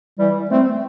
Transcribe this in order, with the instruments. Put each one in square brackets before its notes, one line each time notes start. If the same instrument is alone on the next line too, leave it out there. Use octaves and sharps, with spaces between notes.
[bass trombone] E3 [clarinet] G3
[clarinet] A3 [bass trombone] C4